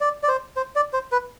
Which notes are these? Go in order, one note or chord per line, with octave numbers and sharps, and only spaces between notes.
D5
D5
C5
C5
D5
C5
B4